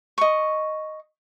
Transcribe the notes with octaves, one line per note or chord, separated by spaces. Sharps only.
D#5 C#6